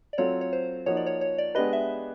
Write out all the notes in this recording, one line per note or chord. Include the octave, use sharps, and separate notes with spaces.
D5
F#3 A3 C4 F4 C#5
C#5
C5
F3 A#3 D#4 F#4 C#5
D5
C#5
C#5
D5
G#3 B3 D4 G4 B4 D#5
E5